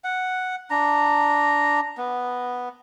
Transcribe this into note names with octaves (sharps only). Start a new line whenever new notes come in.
F#5
D4 A#5
B3